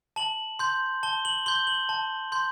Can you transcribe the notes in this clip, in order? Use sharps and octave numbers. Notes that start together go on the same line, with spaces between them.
A5 F#7
C6 G6
A5 G7
F#7
C6 G6 G7
F#7
A5
C6 G6